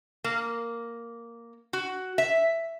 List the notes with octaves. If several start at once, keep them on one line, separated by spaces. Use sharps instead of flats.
A#3
F#4
E5